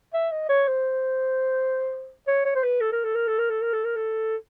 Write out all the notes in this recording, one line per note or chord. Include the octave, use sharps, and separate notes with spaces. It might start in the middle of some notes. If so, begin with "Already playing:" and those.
E5
D#5
C#5
C5
C#5
C#5
C5
B4
A4
A#4
A4
A#4
A4
A#4
A4
A#4
A4
A#4
A4